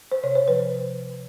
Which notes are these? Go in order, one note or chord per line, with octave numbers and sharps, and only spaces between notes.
C5
C3 C#5
C5
F3 B4